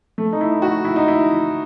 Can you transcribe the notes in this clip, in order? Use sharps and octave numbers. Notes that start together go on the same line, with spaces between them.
A3
D#4
E4
F#4
E4
D#4
E4